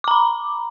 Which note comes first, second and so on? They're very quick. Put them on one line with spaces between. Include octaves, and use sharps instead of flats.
D6 A#5 B5